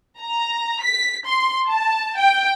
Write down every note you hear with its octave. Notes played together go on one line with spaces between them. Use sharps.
A#5
B6
C6
A5
G5